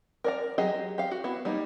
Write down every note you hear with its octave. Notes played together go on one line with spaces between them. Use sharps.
A#4 D5 A#5
F#3 G4 G#4 D#5
G4 F5
F#4
B3 E4
G3 A#3 D#4